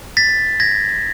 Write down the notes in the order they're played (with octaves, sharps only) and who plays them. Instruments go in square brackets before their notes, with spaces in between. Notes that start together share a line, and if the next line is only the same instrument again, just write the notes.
[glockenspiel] A6 B6
G#6 A#6